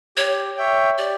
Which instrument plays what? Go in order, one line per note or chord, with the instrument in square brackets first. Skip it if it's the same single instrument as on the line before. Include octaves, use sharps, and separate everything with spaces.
[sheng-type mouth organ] G4 [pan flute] C#5
[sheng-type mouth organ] C#5 E5 G5
[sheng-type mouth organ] G4 [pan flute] D5